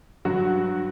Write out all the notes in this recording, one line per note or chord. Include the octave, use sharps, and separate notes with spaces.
G2 F#3 F#4
G2